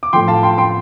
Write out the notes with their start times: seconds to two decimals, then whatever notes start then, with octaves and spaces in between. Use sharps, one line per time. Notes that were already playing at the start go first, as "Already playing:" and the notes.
0.03 D6
0.13 A2 F3 G5 C6
0.28 F5 A5
0.43 G5 C6
0.58 G5 C6